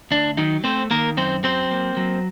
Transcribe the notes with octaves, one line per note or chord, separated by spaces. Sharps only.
D2 D4
D#3 F#3 D#4
A3 C4 C5
D#3 A#3 A#4
F#2 C4 C5
F#3 C4 C5
A#3
F#3